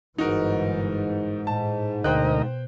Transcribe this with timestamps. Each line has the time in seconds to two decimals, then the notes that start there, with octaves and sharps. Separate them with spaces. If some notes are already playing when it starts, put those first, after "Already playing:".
0.18 G1 G#2 E3 D#4 F#4 A#4
1.47 A2 A5
2.04 D2 B2 A#4 C5 D#5 G5 F#6